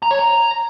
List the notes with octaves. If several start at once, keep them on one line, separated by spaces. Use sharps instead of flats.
A#5
C#5
A#5